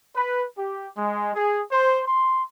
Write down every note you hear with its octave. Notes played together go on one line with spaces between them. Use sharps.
B4
G4
G#3
G#4
C5
C6